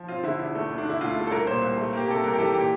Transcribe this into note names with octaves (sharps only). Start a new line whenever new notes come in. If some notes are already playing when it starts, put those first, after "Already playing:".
Already playing: F3
C4 F4
D3 E4
E2 E4
A3
D2
D4
D3 E4
D2 F4
A3
A4
C2 A#4
A#2 C5
C2
A3
A#3 G4
C3 A4
C2 A#4
G4
E3 A4
A#2 G4